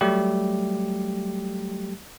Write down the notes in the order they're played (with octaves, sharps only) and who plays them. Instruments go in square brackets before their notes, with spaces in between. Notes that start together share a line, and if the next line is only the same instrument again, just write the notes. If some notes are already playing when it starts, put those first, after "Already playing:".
[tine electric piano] F#3 G3 A3 G4